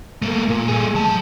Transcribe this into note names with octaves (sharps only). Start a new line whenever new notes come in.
A3 A#3
A#2
A3 G#4
F#3 A5